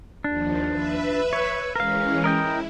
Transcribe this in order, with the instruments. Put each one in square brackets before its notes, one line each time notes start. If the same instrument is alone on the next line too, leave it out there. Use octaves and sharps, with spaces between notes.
[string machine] D#2 F3 [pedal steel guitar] D4
[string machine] B4 E5
[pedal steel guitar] C#5
[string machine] E3 G#3 C#4 [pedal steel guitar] A#4 F5
[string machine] E4 [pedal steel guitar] A#4 D#5 G5